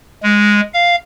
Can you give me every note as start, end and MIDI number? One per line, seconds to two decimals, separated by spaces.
0.23 0.60 56
0.74 0.96 77